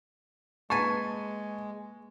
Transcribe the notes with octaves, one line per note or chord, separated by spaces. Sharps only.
G#3 A#3 B4 G#5 A5 C#6 A6